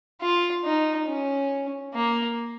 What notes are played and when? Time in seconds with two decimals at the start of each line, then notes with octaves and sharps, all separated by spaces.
0.21 F4
0.64 D#4
1.08 C#4
1.94 A#3